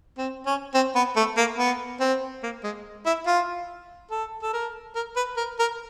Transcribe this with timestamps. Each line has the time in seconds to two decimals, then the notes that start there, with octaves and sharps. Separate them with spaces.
0.18 C4
0.46 C#4
0.74 C4
0.96 B3
1.16 A3
1.37 A#3
1.58 B3
2.00 C4
2.43 A#3
2.64 G#3
3.06 E4
3.27 F4
4.11 A4
4.42 A4
4.53 A#4
4.95 A#4
5.16 B4
5.37 A#4
5.59 A#4